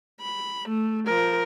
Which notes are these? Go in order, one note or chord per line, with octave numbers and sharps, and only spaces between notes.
B5
A3
F3 A#4